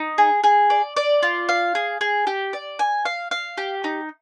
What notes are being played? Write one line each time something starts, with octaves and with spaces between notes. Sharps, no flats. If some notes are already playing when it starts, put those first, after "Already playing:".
Already playing: D#4
G#4
G#4
D5
D5
F4
F5
G#4
G#4
G4
D5
G#5
F5
F5
G4
D#4